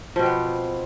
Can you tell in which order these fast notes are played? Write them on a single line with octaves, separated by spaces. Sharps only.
F3 B2 C4 B3